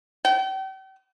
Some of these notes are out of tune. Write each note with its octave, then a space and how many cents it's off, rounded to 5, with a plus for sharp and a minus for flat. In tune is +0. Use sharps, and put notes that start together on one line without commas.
G5 -40